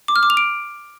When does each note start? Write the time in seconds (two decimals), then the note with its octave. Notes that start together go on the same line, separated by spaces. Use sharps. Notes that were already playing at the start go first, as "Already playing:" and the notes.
0.08 D6
0.16 F6
0.23 D6
0.30 F7
0.37 D7